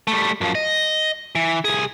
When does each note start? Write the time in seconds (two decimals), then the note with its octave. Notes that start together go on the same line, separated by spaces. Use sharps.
0.07 G3 A3
0.41 F#2 F3
0.55 D#5
1.35 E3
1.65 C2 G#4